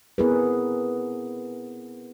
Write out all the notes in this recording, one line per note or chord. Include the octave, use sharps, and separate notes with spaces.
B3 C4 E4 G#4 A#4 B4